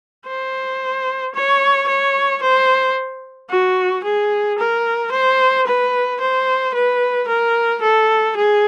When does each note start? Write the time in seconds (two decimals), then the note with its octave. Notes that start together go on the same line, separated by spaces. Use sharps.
0.27 C5
1.34 C#5
1.88 C#5
2.42 C5
3.50 F#4
4.04 G#4
4.58 A#4
5.12 C5
5.67 B4
6.20 C5
6.74 B4
7.28 A#4
7.82 A4
8.36 G#4